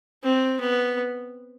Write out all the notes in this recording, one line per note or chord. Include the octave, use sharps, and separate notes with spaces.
C4
B3